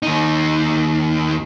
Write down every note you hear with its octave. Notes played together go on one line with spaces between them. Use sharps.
D#2 D#4